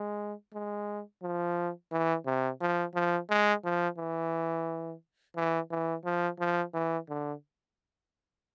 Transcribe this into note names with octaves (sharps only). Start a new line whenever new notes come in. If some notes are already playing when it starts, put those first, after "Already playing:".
Already playing: G#3
G#3
F3
E3
C3
F3
F3
G#3
F3
E3
E3
E3
F3
F3
E3
D3